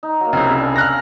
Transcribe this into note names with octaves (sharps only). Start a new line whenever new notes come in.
D#4
F#3 A#3
C2 C#3 G#3 C4 E4
A#4 E5
D4 G#5
F6 F#6 A#6